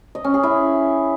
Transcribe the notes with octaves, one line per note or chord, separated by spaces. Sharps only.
D#5
C#4
G#4
E4